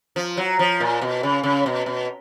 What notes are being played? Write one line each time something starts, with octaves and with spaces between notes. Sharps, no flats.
F3
F#3
F3
A#2
B2
C#3
C#3
B2
B2